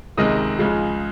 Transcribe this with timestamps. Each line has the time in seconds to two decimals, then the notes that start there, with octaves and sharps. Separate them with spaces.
0.17 C#2 C3 D#3 G#3 D#5 D#6
0.59 C#2 C#3 F3 G#3